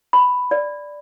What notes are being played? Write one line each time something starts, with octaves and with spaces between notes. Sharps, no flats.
B5
D5